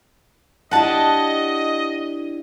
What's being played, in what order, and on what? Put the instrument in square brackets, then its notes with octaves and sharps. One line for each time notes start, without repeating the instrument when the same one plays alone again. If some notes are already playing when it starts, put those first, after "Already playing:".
[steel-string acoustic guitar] D4 E4 G4 [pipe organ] D#5 [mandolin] F#5 A5